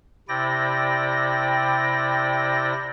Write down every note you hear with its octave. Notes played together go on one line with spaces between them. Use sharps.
C3 E4 D5 G5 A#6